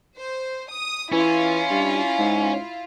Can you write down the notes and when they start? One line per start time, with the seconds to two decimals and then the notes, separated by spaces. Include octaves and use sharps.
0.17 C5
0.70 D#6
1.12 E3 C#4 E4 F4
1.70 G2
2.19 G#2